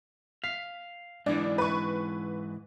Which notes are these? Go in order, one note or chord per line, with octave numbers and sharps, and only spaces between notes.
F5 B6
G#2 E3 D4
B4 C#6